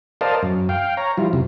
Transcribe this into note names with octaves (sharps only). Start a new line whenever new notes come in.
A#4 C5 D5 D#5 F5 A5
F#2
F5 G5
C#5 A#5
F3 G3 E4 F4
F#2 C3